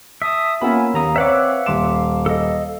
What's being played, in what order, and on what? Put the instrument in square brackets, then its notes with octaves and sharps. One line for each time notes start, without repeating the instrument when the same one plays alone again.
[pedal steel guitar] E5 [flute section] A5 D#6
[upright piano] A#3 B3 C#4 [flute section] F4 F#5 G#5 [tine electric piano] B5 E6
[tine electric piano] D#2 A#5 D#6 [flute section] F5
[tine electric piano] C4 D6 [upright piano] B4 C#5 D5 [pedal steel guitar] E5 F#5 E6
[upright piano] D#1 C6 E7 [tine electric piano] D6
[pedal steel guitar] A4 D#5